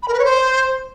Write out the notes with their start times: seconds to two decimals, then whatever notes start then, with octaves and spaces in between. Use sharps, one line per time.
0.03 B5
0.08 A#4
0.14 B4
0.19 C#5
0.25 C5